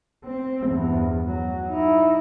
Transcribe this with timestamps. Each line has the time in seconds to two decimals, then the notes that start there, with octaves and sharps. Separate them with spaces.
0.24 C4
0.67 E2 G2
1.26 F#3
1.68 D#4 E4